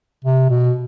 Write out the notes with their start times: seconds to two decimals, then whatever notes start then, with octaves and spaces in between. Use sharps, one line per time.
0.25 C3
0.50 B2